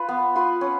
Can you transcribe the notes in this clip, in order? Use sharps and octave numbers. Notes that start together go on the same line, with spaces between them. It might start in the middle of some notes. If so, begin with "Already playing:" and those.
Already playing: F4 B4
B3
F4 B4
C#4